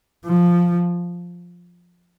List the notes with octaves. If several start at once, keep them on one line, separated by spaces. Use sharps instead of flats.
F3